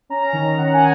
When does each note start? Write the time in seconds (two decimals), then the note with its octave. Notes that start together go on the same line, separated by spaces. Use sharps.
0.10 C#4 A#5
0.33 D#3
0.57 D#3 F#5
0.73 G#5